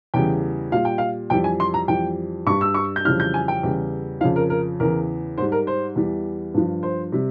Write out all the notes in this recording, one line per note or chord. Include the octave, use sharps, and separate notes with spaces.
E2 C#3 E3 G3 G5
A#2 G3 F5
G5
F5
F2 E3 G3 G5
G#5
C6
A#5
F2 E3 G3 G5
G2 G3 C#6
E6
C#6
G6
F2 C#3 E3 G3 F6
G6
G#5
G5
E2 C#3 G3
F2 C#3 F3 F5
A#4
A#4
E2 C#3 E3 A#4
G#2 G3 C5
A#4
C5
E2 E3 G3
G2 F3
C5
C3 G3